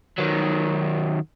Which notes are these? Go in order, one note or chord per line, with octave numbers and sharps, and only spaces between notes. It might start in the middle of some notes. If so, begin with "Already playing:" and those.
D#3 F#3